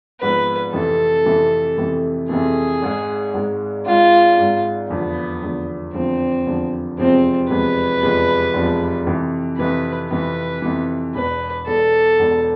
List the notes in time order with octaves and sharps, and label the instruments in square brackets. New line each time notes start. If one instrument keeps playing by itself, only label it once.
[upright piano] G#1 G#2 F3 B3 [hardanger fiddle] B4
[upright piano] F2 C3 E3 A3 [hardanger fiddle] A4
[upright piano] F2 C3 E3 A3
F2 C3 E3 A3
[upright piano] F2 C3 E3 A3 [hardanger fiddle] G#4
[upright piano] G#1 G#2 G#3
G#1 G#2 G#3
[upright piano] G#1 G#2 G#3 [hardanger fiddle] F4
[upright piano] G#1 G#2 G#3
[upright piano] F1 E2 D3 F3 [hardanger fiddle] B3
[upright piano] F1 E2 D3 F3
[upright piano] F1 E2 D3 F3 [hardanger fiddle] C4
[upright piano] F1 E2 D3 F3
[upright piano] F1 E2 C3 F3 G#3 [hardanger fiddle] C4
[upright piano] F1 E2 C3 F3 G#3 [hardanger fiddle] B4
[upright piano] F1 E2 C3 F3 G#3
F1 E2 C3 F3 G#3
F2 C3 E3
[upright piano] F2 C3 E3 [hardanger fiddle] B4
[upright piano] F2 C3 E3 [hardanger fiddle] B4
[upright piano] F2 C3 E3
[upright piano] E1 E2 B2 [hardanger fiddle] B4
[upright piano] E1 E2 B2 [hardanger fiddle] A4
[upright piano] E1 E2 B2